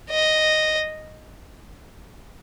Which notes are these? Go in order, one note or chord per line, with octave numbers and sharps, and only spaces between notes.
D#5